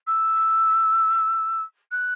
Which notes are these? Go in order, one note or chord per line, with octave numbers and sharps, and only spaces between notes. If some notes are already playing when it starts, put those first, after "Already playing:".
E6
F#6